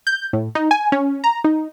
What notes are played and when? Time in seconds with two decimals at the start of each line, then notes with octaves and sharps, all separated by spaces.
0.07 G6
0.33 A2
0.55 D#4
0.71 G#5
0.92 C#4
1.24 A#5
1.44 D#4